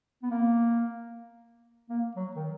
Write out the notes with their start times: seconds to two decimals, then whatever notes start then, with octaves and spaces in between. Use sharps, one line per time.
0.23 B3
0.31 A#3
1.90 A#3
2.16 F#3
2.36 D#3